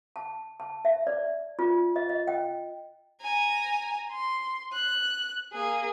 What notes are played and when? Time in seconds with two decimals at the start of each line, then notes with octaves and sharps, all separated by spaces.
0.16 A5
0.60 A5
0.85 E5
1.07 D5
1.59 F4
1.96 D#5
2.09 D#5
2.28 G5
3.21 G#5 A#5
4.11 C6
4.72 F#6
5.53 A#3 G#4